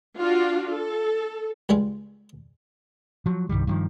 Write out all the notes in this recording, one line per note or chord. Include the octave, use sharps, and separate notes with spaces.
D4 F4 F#4
A4
C#2 G3 G#3 F4
F3 F#3
C2 G2 D#3 G3
G2 D#3 F3